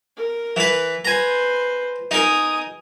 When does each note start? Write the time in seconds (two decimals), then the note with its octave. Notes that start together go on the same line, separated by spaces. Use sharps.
0.17 A#4
0.56 E3 B4
1.05 B4 C5 G#5 A#5
2.11 D#4 A#4 G#5 D#6